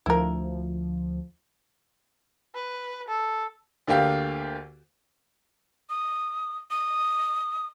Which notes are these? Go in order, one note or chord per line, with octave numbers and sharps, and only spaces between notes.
D2 F3 E4 A#4
B4
A4
D2 D3 A#3 G4 F5
D#6
D#6